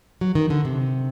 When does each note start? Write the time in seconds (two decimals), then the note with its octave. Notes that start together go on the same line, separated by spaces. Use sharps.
0.21 F#3
0.35 D#3
0.50 D3
0.65 C3